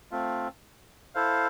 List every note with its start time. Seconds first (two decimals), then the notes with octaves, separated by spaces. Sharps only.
0.11 A3 C4 F4
1.15 E4 A4 C5 F5